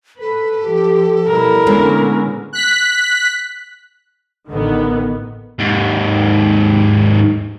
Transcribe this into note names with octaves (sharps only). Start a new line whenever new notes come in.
A4 B4
F3 G4
B2 F#3 G3 E4 A#4
A#2 D3 G#3 B3 C#4
F#6 B6
A1 D3 D#3 B3
D#2 G#2